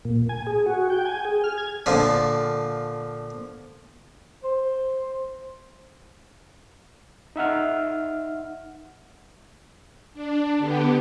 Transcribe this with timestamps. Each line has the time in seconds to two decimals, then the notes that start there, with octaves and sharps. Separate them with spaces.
0.05 A#2
0.29 G#5
0.47 G#4
0.66 F#4
0.90 G5
1.06 G#5
1.25 G#4
1.44 F6
1.58 G#6
1.86 A#2 D3 F3
4.44 C5
7.36 D#4 E5 F#5 F6
10.14 D4
10.58 D3 B3 G4